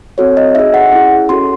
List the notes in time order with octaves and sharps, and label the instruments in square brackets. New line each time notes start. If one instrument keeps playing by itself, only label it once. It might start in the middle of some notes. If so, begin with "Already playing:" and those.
[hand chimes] C4 F#4 A4 C#5
D#5
D#4 G#4 E5
F#5
C#4 E4 G#4
C#4 F#4 A4 C6